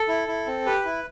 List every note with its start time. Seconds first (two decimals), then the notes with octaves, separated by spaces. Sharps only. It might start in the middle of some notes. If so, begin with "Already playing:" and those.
Already playing: A4
0.08 E4
0.28 E4
0.47 C4
0.66 G4 B4
0.85 E4